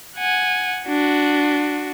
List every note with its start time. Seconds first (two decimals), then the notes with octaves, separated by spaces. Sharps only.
0.17 F#5 G#5
0.87 D4 F#4